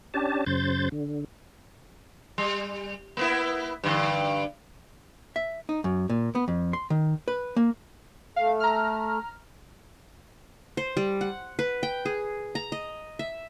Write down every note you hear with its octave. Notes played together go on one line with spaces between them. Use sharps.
C#4 D4 G4 A5
F#2 C#3 C5 G6 A6
D3
G3
A#3 B3 E4
G2 D3
E5
D#4
F#2
A#2
B3
F2
C6
D#3
B4
A#3
A3 F5
A#5 F6
C5
G3
F#5
B4
G5
G#4
A#5
D#5
E5